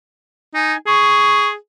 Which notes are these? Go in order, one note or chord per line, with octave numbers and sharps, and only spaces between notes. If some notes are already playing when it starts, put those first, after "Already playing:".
D#4 G#5
G#4 C#6